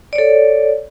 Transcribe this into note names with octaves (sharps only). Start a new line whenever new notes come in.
A4 C#5 D5